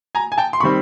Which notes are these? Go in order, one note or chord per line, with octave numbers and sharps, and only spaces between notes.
G#5 A#5
G#5
G5 A5
C6
D#3 G3 C4 B5 C#6